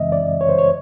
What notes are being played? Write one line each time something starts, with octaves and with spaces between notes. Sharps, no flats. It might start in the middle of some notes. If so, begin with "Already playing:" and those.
Already playing: F#2 C#3 E3 G#3 C4 D#5 E5
D5
C#5
C5
C#5